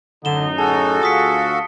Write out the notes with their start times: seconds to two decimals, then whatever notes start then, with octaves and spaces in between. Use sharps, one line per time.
0.25 F#2 A2 D3 D#4 E7 G7
0.58 F#4 G#4 A4 A5
1.03 D2 F4 F5 D#6 B6 C#7